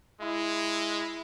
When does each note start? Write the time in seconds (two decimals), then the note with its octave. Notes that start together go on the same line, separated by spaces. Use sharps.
0.21 G#3 E4